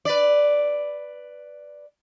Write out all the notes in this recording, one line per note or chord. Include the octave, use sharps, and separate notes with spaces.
B4 D5